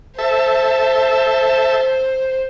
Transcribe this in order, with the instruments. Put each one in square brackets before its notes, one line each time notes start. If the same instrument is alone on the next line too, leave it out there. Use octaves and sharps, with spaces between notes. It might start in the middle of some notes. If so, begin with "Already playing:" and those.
[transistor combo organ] A4 E5 [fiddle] C5